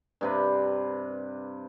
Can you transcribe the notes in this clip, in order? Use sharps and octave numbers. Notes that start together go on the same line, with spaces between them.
G2 C3 B4